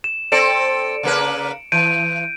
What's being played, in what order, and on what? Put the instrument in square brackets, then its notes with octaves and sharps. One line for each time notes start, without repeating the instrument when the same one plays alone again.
[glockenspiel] E7
[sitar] C4 A4 D5 [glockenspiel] C#7 D7 E7
[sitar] C#3 A#3 B4
[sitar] E3 [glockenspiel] G6 D7 D#7